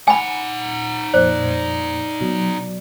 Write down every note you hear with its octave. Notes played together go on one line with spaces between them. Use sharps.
D#4 F#5 G#5 B5
F2 A#2 C5 D5
B2 F#3